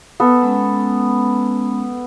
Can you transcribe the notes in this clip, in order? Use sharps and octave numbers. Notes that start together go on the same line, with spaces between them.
B3 A4
G#3 C#4 B5